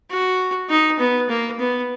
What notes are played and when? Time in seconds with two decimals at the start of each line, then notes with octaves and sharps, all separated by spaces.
0.11 F#4
0.69 D#4
0.99 B3
1.29 A#3
1.59 B3